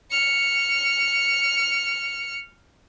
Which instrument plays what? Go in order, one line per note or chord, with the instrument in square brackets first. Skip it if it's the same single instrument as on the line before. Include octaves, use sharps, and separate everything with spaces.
[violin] F6 C#7